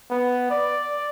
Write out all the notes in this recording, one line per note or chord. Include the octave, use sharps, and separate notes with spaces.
B3
D5